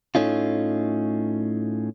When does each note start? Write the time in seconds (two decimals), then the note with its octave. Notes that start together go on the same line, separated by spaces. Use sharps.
0.15 A2 A3 C#4 D#4 F4